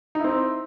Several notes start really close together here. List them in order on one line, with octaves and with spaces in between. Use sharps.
D#4 E4 C4